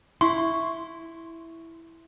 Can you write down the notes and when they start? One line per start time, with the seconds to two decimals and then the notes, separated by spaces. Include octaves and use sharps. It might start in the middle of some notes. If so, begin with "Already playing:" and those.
0.21 E4 C6 C#6